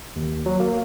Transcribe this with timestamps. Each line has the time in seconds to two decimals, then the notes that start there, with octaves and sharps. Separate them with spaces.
0.16 D#2
0.46 F#3
0.60 A#3